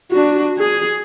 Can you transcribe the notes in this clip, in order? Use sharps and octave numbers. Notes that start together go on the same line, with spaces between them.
D4 F#4
G#4